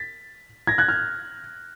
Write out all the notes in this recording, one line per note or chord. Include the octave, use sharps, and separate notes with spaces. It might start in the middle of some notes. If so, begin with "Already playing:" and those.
Already playing: A6 B6
G#6 A#6
F#6 G#6
F6 G6